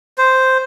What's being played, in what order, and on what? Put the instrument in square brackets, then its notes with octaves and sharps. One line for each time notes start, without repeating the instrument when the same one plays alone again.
[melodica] C5